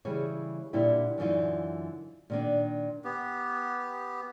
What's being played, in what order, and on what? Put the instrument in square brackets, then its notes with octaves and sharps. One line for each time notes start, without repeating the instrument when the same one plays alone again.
[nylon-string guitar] C#3 E3 G3 G#4 C#5
A#2 D3 G3 D4 E4 G4
F#2 D3 E3 D#4 F4
A#2 D#3 D4
[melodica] B3 G4